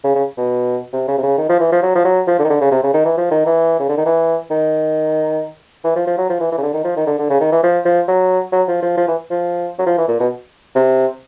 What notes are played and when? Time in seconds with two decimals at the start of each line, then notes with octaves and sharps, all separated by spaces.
0.04 C#3
0.15 C#3
0.37 B2
0.93 C3
1.08 C#3
1.18 C3
1.23 C#3
1.38 D#3
1.49 F3
1.60 E3
1.72 F3
1.83 F#3
1.95 F3
2.05 F#3
2.27 F3
2.39 D3
2.44 D#3
2.50 D3
2.61 C#3
2.71 C3
2.83 C#3
2.94 D#3
3.05 E3
3.17 F3
3.31 D#3
3.46 E3
3.79 C#3
3.89 D3
3.97 D#3
4.06 E3
4.50 D#3
5.84 E3
5.96 F3
6.07 F3
6.18 F#3
6.29 F3
6.40 E3
6.52 E3
6.58 C#3
6.63 D3
6.74 D#3
6.84 F3
6.96 D#3
7.07 D3
7.19 D3
7.30 C#3
7.40 D#3
7.52 E3
7.63 F3
7.85 F3
8.08 F#3
8.52 F#3
8.68 F3
8.82 F3
8.97 F3
9.08 E3
9.30 F3
9.79 F#3
9.86 F3
9.98 E3
10.08 A#2
10.20 B2
10.75 C3